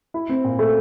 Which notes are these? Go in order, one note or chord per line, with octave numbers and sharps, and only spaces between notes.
E4
C4
A#2
A3